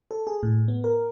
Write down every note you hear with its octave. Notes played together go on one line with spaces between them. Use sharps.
A4
G#4
A2
B3
A#4